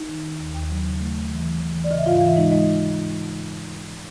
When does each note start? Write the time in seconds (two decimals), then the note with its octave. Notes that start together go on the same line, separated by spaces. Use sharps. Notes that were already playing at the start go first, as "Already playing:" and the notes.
Already playing: D#4
0.09 D#3
0.25 D#3
0.39 D#2
0.55 D#2
0.70 F#3
0.85 C#3
0.99 A3
1.15 A3
1.31 E3
1.45 E3
1.60 E3
1.75 E3
1.84 D5
1.91 C#3 D#5
1.98 E5
2.05 G#2 F4 F5
2.17 E3 F5
2.26 E5
2.36 G#3 D#4 D#5
2.51 G#3 D#4 D#5